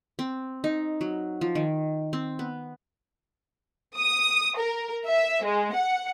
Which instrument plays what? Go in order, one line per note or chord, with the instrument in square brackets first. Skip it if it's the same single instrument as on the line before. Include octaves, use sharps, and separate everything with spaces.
[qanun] C4
D#4
F#3
F3
D#3
C4
B3
[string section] D#6
A#4
E5
G#3
F#5